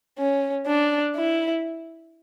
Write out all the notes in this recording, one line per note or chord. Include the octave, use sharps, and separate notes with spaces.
C#4
D4
E4